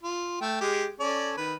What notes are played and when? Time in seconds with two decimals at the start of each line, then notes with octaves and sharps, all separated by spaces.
0.03 F4
0.41 A3 G5
0.61 G#3 G4
1.00 C#4 A4 D5
1.37 D#3 B4